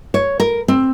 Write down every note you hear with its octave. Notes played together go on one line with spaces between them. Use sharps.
C#5
A#4
C4